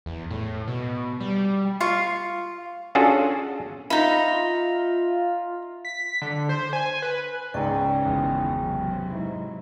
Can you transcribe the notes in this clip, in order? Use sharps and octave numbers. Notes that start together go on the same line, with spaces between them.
E2
A2
B2
G3
F4 F5 C#6
C#4 D4 F4 F#4 G#4 A4
D#4 F4 E5 A#5 B5 A#6
B6
D3
C5
G#5
B4
C#2 G#2 C#3 D#4 D5 G5 G#5 A#5
G#1 E2
C3 F#3
G#2 E4